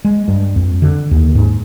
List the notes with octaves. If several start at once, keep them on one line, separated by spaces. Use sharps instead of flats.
G#3
G2
F2
D3
D#2
G#2